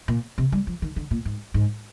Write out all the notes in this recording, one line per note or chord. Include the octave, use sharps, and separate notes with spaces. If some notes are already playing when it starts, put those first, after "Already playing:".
A#2
C3
G3
F3
D#3
D3
A#2
G#2
G#2